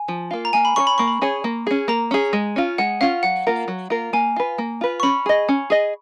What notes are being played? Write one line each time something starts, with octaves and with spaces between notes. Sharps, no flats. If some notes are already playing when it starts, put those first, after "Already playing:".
Already playing: G#5
F3
A#3 F4
A#5
A#3 G#5
B5
C#4 G#4 C#5 C#6
B5
A#3 C#6
B5
C#4 G#4 C#5
A#3
C#4 G#4
A#3 A#5
C#4 G#4
G#3
C#4 F4
G#3 F#5
C#4 F4 F5
F#3 F#5
A#3 F4 A#4
F#3
A#3 F4 A#4
A#3 G#5
F4 B4
A#3
F4 B4
C#6
C#4 B5
G#4 D#5
C#4
G#4 D#5